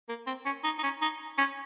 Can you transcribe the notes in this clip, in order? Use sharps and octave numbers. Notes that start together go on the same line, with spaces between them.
A#3
C4
C#4
D#4
D#4
C#4
D#4
C#4